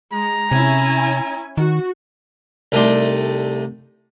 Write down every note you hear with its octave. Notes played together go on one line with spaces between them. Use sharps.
G#3 A#5
C3 C#4 E4 G#5
D#3 F#4
C2 A3 D#4 G4 D5 C6